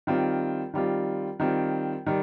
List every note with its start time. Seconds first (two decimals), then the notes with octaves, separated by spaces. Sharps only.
0.07 D#3 G3 C4 F4
0.74 D#3 G3 C4 F4
1.40 D#3 G3 C4 F4
2.06 D#3 G3